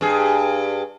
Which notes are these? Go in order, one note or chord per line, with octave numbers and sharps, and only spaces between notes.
G2 G#4